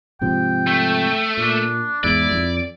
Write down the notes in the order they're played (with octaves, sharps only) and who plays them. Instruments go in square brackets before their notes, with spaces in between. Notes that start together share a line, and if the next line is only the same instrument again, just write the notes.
[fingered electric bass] G#2 C3 F3 [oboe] G5
[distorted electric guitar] A3
[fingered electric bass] A#2 [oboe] D4
[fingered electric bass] E2 G#2 [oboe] E4 [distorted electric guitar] D5
[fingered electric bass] F2